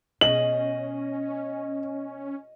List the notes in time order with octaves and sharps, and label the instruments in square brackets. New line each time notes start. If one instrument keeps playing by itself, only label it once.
[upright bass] B2 [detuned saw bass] C#4 [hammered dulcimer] D#5 [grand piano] F#7